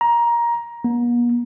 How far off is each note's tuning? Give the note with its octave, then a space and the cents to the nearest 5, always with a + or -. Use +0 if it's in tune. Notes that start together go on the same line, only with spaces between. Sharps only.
A#5 +15
B3 -45